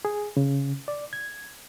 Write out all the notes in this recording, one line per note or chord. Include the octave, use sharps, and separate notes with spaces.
G#4
C#3
D5
G#6